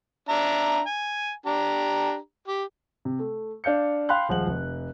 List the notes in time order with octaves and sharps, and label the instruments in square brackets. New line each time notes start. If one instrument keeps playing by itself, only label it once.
[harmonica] D4 E5 A#5
G#5
D4 G4 A#5
G4
[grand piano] C3
A3
D4 F5 G6 C#7
F5 G5 B5 C6 F#6
D#1 F3 G#3 C5 F#5 F#7
F1